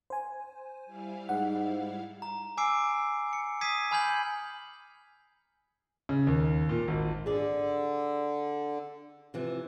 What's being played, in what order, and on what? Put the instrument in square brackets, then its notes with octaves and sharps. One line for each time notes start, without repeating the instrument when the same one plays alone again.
[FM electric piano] C5 G#5
[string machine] G3 E4 F5
[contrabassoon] G#2 [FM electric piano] F#5
[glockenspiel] A#5
G#5 D6 E6 C7 D7
C#7
D#6 G#6 B6 C7 D#7
G#5 B5 F6 G6 G#6 F#7
[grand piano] C#3
D#2
A#2
G#1
[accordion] D3 [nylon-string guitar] G#4 D5
[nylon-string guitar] C3 E3 F3